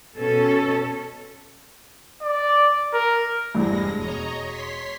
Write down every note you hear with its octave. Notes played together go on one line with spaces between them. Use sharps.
B2 C#4 A4
D5
A#4
F1 E2 G2 G#3 A#6
E1 C#5 D#5 A#5
C#5 C6 B6